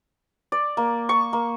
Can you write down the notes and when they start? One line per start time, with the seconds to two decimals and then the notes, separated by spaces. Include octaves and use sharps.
0.52 D5
0.77 A#3
1.09 C#6
1.33 A#3